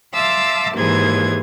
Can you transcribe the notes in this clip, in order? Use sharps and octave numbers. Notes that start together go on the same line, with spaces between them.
E5 F5 A5 C6 D6 E6
D#2 G#2 E3 G#4 C5 G#6